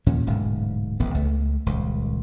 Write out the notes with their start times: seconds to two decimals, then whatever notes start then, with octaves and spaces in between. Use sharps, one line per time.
0.06 D#2 A#2 F3 C#4
0.27 D1 G#2 B2
1.00 D#1 A1 B3
1.14 C#2 A3
1.66 D#1 C#2